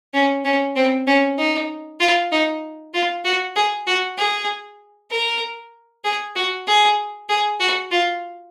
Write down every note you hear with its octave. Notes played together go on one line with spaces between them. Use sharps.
C#4
C#4
C4
C#4
D#4
F4
D#4
F4
F#4
G#4
F#4
G#4
A#4
G#4
F#4
G#4
G#4
F#4
F4